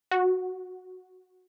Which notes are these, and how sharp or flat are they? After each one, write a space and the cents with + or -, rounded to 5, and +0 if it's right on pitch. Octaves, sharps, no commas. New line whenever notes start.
F#4 -5